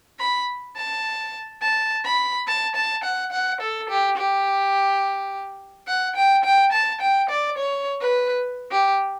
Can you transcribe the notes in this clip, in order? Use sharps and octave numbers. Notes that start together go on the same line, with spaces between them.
B5
A5
A5
B5
A5
A5
F#5
F#5
A4
G4
G4
F#5
G5
G5
A5
G5
D5
C#5
B4
G4